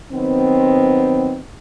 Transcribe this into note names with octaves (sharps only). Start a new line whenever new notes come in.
D#3 F#3 B3 C4